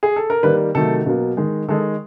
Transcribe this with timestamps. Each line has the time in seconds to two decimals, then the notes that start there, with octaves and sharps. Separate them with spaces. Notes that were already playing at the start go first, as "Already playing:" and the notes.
0.03 G#4
0.16 A4
0.30 A#4
0.43 D#3 G3 A#3 B4
0.75 C3 D#3 F#3 A3 A4
1.06 B2 F#3 A#3
1.37 D#3 G#3
1.68 D#3 G#3 A4